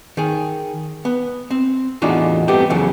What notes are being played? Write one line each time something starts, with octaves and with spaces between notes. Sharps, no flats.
D#3 G#4
B3
C4
E2 A2 D4 D#4 F4 F#4
G2 A3 B3 C4 G4
E2 C#3 F3 F#3 A3